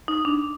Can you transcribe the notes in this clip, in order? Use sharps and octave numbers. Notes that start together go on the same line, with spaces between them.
D#4
D4